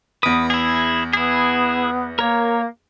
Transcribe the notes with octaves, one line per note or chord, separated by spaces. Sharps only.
E2 B4 D#6 D7
E4 G#4
B3 E4 G#4
A#3 A#4 C#5